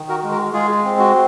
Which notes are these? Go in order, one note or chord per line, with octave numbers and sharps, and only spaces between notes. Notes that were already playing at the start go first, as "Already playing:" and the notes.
Already playing: D#3
F#4 A#4
G#3
F#4 A#4
G#3 F4 G#4
C4
F#4